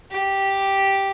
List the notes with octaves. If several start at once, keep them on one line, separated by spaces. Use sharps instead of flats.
G4